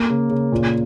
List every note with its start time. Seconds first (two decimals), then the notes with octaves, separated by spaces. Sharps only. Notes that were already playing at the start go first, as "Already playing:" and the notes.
Already playing: A#3
0.10 C#3
0.30 C#3
0.52 A#2